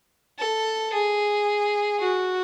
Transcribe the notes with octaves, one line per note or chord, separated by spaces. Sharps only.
A4
G#4
F#4